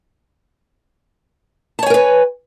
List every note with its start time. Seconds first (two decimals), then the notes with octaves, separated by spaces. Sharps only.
1.79 A5
1.83 C#5
1.86 G#5
1.90 A#4
1.94 B4